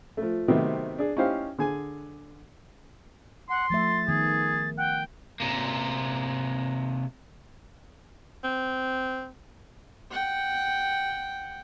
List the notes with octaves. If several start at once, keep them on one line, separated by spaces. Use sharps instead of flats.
F3 A3
C3 D#3 F#3 A3 B3 C4
D4 G#4
C#4 D#4 E4 G4 C5 F5
D3 G#4 G#5
F#5 C6
F3 A3 E5 A6
D#3 B3 G#4
F#5 G5
C3 A#3
C4
F#5 G5